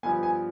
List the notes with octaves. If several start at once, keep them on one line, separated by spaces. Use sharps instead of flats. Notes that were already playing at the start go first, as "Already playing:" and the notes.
G2 F3 B3 G#5
G#5